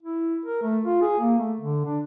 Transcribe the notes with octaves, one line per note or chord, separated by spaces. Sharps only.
E4
A#4
A3
F4
G#4
A#3
A3
D3
D4